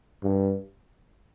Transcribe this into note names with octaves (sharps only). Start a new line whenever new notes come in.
G2